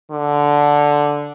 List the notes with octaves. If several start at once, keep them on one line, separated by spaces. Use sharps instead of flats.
D3